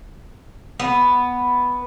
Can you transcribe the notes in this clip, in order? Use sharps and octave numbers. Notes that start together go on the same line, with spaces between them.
B3